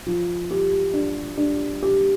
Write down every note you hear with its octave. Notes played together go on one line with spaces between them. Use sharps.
F3
G4
D4
D4
G4